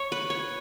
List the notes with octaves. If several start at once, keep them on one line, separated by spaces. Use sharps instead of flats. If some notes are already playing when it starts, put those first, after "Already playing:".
Already playing: C#5
B4
C#5